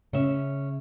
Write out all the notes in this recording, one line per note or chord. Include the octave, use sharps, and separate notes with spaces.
C#3 C#4 E5